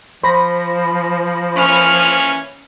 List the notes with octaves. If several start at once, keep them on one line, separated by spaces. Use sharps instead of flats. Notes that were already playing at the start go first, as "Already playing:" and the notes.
F3 C5 B5 A#6
E3 A#3 C#4 F6